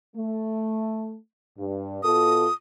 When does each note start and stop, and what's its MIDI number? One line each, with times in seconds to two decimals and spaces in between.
0.16 1.16 57
1.57 2.00 43
2.03 2.46 47
2.03 2.46 65
2.03 2.46 69
2.03 2.54 87